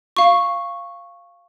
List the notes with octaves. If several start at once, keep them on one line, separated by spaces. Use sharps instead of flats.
F5 C#6